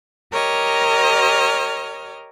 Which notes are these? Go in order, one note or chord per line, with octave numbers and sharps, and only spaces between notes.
G4 A#4 C#5 D#5 F6